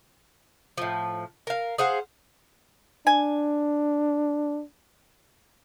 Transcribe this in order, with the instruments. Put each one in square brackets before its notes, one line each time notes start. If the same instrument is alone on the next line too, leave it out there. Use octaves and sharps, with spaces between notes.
[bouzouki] A2 F3
A#4 F5
G#4 C5 F5 F#5
[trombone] D4 [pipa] G#5